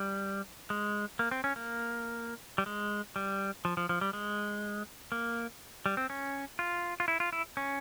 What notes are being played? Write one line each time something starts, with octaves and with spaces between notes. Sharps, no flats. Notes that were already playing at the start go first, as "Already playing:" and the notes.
Already playing: G3
G#3
A#3
C4
C#4
A#3
G3
G#3
G3
F3
F3
F3
G3
G#3
A#3
G3
C4
C#4
F4
F4
E4
F4
E4
C#4